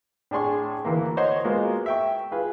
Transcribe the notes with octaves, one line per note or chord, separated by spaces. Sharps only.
A2 D4 G#4 C6 C#6
D2 E3 A#3
C5 C#5 D#5 F#5 C6
G#3 A#3 B3 F4 F#4
E5 G5 C#6
F4 G#4 B4